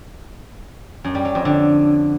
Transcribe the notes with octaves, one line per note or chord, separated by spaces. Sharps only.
F#2
G3
F#3
F2
D3